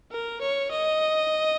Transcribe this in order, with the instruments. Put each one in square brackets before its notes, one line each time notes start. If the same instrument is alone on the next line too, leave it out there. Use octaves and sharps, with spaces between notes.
[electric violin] A#4
C#5
D#5